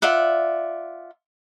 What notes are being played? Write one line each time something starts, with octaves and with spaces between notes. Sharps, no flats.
F4 D5 E5 F#5